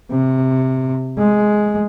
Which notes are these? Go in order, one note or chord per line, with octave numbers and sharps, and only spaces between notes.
C3
G#3